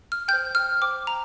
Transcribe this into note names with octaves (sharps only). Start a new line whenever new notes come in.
F6
C5 G5 G6
F6
C5 G5 D6
A#5